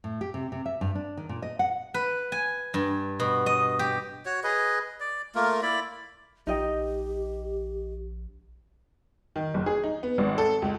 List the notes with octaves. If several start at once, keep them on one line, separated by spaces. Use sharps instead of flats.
A2
G4
C3
C3
E5
G2
D4
D#3
A#2
D#5
F#5
B4
G#5
G2
B2
D#5
G4
F#4 C#5
G#4 B4 D#5
D5
A3 A#3 F4 A#4
E4 D5 B5
A#1 D#4 G4 D#5 G5
D#3
F#1
G#4
D#4
B3
G#1
A4
C#2